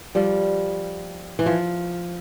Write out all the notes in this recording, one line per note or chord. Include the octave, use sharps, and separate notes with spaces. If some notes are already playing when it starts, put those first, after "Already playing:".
F3 G3
E3
F3